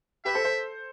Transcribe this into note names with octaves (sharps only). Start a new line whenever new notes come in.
G4 B4 E5
A4 C5
A4 C5